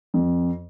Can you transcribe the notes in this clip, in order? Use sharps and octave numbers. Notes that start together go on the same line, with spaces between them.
F2